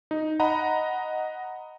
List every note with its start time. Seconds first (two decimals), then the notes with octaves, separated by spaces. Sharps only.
0.11 D#4
0.40 D#5 F#5 A#5 B5